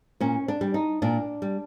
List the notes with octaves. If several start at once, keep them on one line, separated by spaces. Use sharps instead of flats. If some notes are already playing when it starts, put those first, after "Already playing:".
A#2 C#4
D4
G3
D#4
A#2 D4
G3